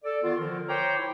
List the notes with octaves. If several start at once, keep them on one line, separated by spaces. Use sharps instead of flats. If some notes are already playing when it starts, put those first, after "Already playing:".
A4 D5
D#3 B3 F4
D3 F3 A#4
C5 C#5 G5 A#5 D6
E4